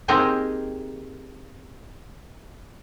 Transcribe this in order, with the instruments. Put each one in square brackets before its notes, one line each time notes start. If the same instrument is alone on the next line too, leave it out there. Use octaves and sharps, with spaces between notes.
[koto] A#3 C4 D#4 G4 G#4 D#5